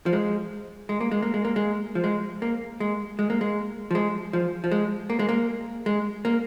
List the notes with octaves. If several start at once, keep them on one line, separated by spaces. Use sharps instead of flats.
F3
G#3
G#3
A#3
G#3
A#3
G#3
A#3
G#3
F3
G#3
A#3
G#3
G#3
A#3
G#3
F3
G#3
F3
F3
G#3
A#3
G#3
A#3
G#3
A#3